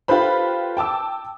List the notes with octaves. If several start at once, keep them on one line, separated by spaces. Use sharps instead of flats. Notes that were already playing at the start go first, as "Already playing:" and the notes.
F4 G4 A4 B4 C5 B5
G5 A5 D6 E6